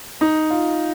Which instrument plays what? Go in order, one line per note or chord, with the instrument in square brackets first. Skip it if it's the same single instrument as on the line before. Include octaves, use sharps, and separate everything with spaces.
[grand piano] D#4
F4